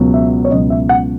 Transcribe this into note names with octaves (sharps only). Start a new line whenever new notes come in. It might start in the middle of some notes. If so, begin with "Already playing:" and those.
Already playing: C#2 B2 F#3
E5
C#5
C#2 B2 F#3 D#5
E5
F#5